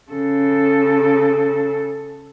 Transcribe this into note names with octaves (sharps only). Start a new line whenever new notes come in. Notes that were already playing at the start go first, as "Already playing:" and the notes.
C#3 A4